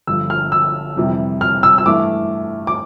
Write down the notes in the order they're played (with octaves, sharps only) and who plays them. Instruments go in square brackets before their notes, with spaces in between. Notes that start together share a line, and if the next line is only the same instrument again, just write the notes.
[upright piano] G1 G2 F3 E6
F6
E6
F2 C3 E3 G3
F6
E6
E6
G2 E3 A3 D6
D6